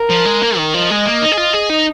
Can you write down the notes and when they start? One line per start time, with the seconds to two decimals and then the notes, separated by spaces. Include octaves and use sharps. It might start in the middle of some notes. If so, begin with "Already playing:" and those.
Already playing: A#4
0.10 F3
0.26 G#3
0.42 A#3
0.57 D#3
0.74 F3 D#5
0.90 G#3
1.06 A#3
1.22 D#4
1.32 G#4
1.37 F4
1.53 G#4
1.69 D#4